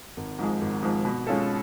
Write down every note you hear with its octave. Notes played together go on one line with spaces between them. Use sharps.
G#1
G#2 F3 G#3
G#1
G#2 F3 G#3
B2
G#3 C#4 F4 A4